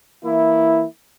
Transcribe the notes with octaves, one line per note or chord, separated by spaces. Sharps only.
E3 A#3 E4